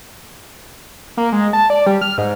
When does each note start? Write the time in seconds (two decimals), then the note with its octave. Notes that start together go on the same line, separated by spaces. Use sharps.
1.17 A#3
1.32 G#3
1.53 A5
1.70 D5
1.86 G3
2.01 F6
2.18 G#2